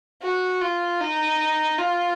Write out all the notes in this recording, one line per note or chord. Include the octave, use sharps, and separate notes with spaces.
F#4
F4
D#4
F4